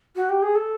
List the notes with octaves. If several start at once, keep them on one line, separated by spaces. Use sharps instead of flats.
F#4
G4
G#4
A4